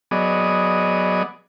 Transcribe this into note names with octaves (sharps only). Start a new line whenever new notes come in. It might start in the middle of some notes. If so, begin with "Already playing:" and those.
F#3 B3 G#4 D5 D#5